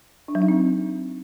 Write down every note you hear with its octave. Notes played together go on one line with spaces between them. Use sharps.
D4
F#3
D#4
C4